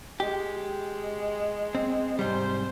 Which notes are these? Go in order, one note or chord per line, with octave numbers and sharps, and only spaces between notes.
G#3 G4
C4
G#2 C3 G3 C5